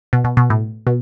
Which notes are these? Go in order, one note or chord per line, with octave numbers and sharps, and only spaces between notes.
B2
B2
B2
A2
B2